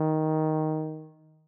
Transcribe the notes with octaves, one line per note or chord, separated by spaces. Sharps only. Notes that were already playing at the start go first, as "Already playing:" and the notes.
Already playing: D#3